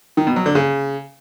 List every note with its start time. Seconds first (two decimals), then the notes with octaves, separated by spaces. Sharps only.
0.17 D#3
0.27 B2
0.36 F#3
0.46 D3
0.55 C#3